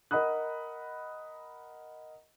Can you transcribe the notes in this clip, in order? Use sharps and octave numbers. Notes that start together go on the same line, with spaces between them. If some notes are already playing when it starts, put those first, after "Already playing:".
A#4 D#5 F#5 B5 D#6 F#6